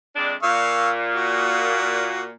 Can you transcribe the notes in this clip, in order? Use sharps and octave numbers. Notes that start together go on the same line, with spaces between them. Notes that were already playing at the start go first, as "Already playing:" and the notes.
F2 G#3 D4
A#2 F5 C#6 E6
F#4